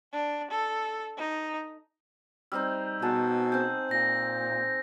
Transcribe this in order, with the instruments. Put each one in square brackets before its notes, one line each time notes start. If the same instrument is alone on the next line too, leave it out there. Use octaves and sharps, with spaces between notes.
[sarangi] D4
A4
D#4
[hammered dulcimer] G3 C4 D#4 [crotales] E6
[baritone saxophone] B2 [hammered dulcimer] G#4 F#5 A5
[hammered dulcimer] C4 G#4 [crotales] G6
[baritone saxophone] A#2 [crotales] A#6